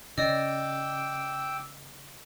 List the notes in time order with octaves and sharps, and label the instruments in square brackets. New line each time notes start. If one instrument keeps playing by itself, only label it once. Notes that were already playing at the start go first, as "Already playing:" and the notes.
[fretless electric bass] C#3 [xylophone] D5 D#5 [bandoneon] G5 D6 E6